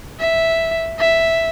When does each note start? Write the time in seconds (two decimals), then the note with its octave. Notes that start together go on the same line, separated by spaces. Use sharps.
0.19 E5
0.99 E5